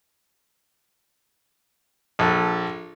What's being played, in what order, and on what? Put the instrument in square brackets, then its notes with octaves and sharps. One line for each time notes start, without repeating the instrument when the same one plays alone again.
[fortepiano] A#1 A4